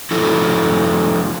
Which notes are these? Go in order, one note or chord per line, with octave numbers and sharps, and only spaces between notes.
F3 E4 F#4 A4